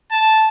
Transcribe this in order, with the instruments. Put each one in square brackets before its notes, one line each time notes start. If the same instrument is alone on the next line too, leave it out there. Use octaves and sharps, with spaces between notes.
[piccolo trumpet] A5